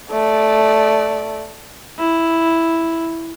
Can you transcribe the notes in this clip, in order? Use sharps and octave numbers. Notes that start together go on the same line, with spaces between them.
A3 D5
E4